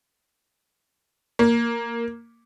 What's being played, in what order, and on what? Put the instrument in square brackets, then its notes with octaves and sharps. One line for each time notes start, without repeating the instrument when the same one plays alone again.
[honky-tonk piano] A#3